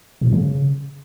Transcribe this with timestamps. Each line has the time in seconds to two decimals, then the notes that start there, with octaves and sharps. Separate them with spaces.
0.21 G#2
0.27 F#2
0.32 C#3